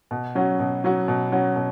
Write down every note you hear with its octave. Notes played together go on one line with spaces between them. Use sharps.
B2
F#3 C#4 F#4
B2
F#3 C#4 F#4
B2
F#3 C#4 F#4
B2